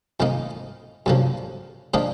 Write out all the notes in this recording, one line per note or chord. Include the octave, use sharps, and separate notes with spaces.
F2 D#3 A#3 D#4
F#2 D3 F3 A#3
A#2 F3 A#3 D4 D#5